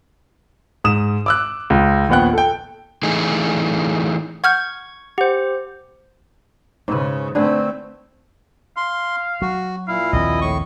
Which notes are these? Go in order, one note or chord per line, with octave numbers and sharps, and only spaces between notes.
G#2 D#6 E7
D6 E6 F#6
C#2
A#1 D#2 B3 F#5 G5 F#6
A4 G5
E3 A3 D#4 G#4
F#5 C#6 F6 G6 G#6
G4 C5 F#5
G#2 C#3 B4
D3 A3 C4 G#4 B4
F5 C6
F#3 F#4
A#2 E4 F5
A#1 D#2 C4 D#5
A2 C#6